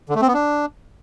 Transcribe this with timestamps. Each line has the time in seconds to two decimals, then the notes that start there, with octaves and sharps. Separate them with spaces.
0.09 D3
0.15 A3
0.22 C4
0.28 B3
0.34 D4